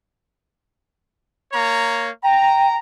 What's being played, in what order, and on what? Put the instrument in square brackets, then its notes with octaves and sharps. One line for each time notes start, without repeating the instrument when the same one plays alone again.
[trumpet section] A#3 C#5 A#5
[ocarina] G5 [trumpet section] A#5